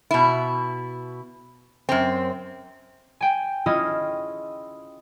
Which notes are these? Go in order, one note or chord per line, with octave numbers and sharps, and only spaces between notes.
B2 E4
F#2 C4
G5 G#5
C#4 E4 F4 G#4 D#5